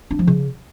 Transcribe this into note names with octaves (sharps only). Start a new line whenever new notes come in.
D4
F3
C#3